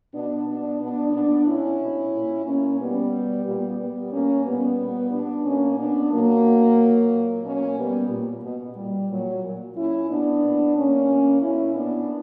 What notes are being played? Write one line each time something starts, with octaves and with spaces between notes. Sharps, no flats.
B2 B3 D4
B2 B3 D4
B2 B3 D4
A#2 B3 D4
A#2 C#4 E4
B2
A#2
B2 A#3 C#4
B2 G3 B3
B2
A#2 G3 B3
A#2 G3 B3
B2 A#3 C#4
A#2 G3 B3
A#2
A#2 B3 D4
B2 A#3 C#4
B2 B3 D4
A#2 F#3 A#3
B2
A#2
A#2
B2 A#3 C#4
B2 G3 B3
A#2
B2
A#2 G3
A#2 F#3
A#2
A#2 C#4 E4
B2 B3 D4
A#2
A#2 A#3 C#4
B2
B2 C#4 E4
A#2 B3 D4